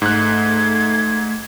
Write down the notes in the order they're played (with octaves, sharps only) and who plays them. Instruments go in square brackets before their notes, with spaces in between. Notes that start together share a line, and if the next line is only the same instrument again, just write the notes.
[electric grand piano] G#2 F#6 [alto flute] A3 [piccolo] G#6